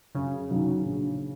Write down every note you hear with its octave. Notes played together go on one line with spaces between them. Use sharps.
F#2 C#3
D#3 F#3
A#1